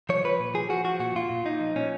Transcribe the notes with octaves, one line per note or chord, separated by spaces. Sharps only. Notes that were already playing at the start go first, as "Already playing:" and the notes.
F3 C#5
F3 B4
A#2
F3 G#4
F3 F#4
F3 F#4
A#2 F#4
A#2 F4
A#2
A#2 D#4
F3
A#2 C#4